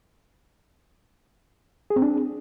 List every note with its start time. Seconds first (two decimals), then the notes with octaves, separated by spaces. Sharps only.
1.90 G#4
1.96 C4
2.02 D4